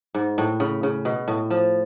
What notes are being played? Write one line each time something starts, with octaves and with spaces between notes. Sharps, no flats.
G#2
A2
C#3
C#3
B2
A2
F3